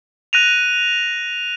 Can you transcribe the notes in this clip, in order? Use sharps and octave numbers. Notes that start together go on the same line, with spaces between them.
F#6 A#6 D#7 F7